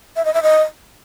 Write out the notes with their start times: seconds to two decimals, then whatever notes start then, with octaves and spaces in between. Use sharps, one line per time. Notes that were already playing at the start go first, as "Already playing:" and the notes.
0.16 E5
0.25 D#5
0.34 E5
0.43 D#5